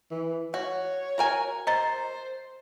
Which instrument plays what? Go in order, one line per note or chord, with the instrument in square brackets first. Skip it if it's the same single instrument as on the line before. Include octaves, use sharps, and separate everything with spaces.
[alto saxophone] E3
[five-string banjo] F#4 [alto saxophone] C#5
[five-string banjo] F#4 A#4 G#5
[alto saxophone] C5 [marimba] D#5 A#5 A6